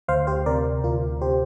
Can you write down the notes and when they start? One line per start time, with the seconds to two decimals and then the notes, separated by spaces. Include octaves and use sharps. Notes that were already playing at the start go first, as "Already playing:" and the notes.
0.08 D2 C5 F5
0.27 G4 C5
0.46 C3 A#4 D5
0.84 D2 F4 A#4
1.21 C3 G4 C5